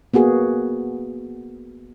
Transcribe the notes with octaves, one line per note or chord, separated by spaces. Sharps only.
A#3 B3 F#4 G#4